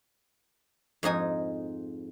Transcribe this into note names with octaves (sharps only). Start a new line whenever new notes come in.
F2 G#2 D#4 G#5